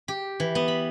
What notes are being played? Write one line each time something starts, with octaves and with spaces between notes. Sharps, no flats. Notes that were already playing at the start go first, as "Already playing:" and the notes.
G4
E3
B3
B5